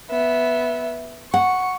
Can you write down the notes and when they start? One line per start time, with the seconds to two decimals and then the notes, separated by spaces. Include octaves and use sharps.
0.10 B3 E5
1.34 F#5 C#6